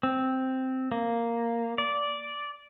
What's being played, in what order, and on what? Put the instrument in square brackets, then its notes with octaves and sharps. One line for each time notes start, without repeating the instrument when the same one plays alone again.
[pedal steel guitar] C4
A#3
D5